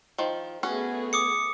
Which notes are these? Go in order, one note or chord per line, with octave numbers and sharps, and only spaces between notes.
D#3 F3
A3 B3 C#4 F#4 G#4
D6 D#6 C#7